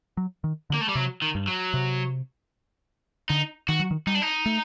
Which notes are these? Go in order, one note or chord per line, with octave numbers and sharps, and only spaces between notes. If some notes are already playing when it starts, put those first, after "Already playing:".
F#3
D#3
D3
A#3
A3
G3
C3 F#3
D#3
G2
F#3
C3
D3 D#4
D#3 F#4
F#3
D#3
G3 D#4
D4
D#4
A3